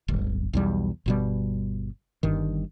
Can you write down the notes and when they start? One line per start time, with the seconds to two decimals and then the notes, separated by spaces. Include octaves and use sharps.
0.08 D1 G1
0.53 B1 E2 G3
1.06 G1 B2 G3
2.23 G1 G2 D#3